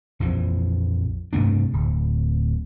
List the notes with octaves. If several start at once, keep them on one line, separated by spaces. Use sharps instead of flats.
A#1 F2 E3 F3
G2 C3 A3 D4
D1